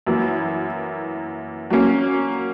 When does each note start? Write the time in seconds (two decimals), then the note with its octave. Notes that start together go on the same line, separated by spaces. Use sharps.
0.07 F#2 E3 A#3 E4
1.70 F#3 A#3 C#4